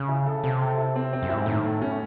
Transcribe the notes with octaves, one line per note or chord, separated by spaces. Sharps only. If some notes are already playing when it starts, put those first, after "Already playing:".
Already playing: C#3
E4
A4
C3 A4
A4
E4
C4
C4
F#2
E4
G#2
A2 D#3
A3
C#4